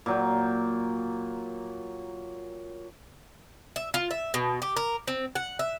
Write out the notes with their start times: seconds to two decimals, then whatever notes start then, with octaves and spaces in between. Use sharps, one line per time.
0.06 A#2 F#3 G5
3.76 E5
3.94 F4
4.11 E5
4.34 B2
4.62 G4
4.77 A#4
5.08 C4
5.35 F#5
5.59 E5